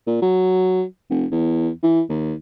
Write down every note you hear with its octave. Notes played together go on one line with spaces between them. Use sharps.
A#2
F#3
F1
E2
E3
D#2